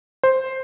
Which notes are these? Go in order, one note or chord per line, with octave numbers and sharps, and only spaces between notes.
C5